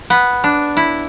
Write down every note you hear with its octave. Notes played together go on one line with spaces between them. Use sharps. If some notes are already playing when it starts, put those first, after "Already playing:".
B3
D4
E4